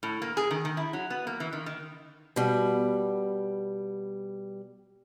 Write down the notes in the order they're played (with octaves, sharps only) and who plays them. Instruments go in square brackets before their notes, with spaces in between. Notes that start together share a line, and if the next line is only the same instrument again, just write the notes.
[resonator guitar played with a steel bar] A2
A#3
G#4
D#3
D#3
E4
F#3
B3
A#3
E3
D#3
D#3
[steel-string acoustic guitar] B2 G3